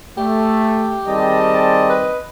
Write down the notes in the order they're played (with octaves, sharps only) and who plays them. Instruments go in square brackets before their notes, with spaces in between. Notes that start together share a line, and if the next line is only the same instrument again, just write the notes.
[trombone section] A3 [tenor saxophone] G4
[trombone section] D#3 G3 C4 [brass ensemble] G#4 D5 A5 [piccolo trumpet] D#5
[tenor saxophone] B4